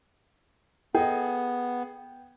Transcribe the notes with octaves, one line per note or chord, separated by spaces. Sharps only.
B3 G#4 A4 D#5 G5